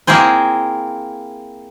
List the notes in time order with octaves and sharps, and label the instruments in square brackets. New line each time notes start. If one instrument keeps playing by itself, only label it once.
[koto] A#3 C4 E4 G#4 C5